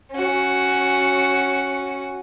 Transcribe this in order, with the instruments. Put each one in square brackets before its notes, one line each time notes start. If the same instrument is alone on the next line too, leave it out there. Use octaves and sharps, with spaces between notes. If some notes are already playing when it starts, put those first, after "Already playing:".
[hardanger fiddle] C#4 F#4